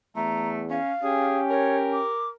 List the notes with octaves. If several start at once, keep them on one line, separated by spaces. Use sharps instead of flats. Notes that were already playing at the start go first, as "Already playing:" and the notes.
E2 A3 A#5
C#4 F5
C#4 G4 G#4
A#4 C#5
D6